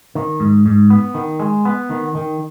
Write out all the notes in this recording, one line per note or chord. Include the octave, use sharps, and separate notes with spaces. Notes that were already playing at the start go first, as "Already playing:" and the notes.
D#3
G#2
G#2
B3
D#3
G#3
B3
D#3
D#3